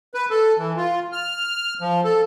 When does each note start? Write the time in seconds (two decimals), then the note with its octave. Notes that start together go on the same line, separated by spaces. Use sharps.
0.14 B4
0.30 A4
0.58 E3
0.77 F4
1.12 F6
1.81 F3
2.04 A4